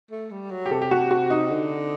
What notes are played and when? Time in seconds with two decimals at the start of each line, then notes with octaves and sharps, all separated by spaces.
0.11 A3
0.31 G3
0.51 F#3
0.66 G4
0.71 C3 A4
0.82 G4
0.91 F#4
1.11 F#4
1.30 D#4
1.50 D3